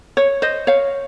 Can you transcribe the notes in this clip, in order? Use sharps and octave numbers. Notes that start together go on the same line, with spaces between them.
C#5
C5 D#5
C#5 F5